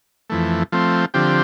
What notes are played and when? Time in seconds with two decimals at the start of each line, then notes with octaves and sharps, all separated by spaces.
0.30 F2 E3 A3
0.72 F3 A3 C4
1.14 D3 F3 C4 G4